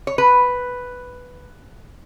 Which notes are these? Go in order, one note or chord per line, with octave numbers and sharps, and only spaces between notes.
C#5
B4